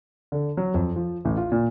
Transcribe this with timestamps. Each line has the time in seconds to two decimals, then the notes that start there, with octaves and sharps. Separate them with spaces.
0.32 D3
0.57 F#3
0.74 F2
0.96 F3
1.25 A1
1.37 F4
1.52 A#2